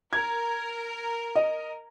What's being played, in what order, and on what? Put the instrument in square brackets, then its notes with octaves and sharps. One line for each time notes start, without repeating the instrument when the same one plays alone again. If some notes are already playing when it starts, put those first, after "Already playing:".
[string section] A#4 [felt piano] G#6
[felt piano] D#5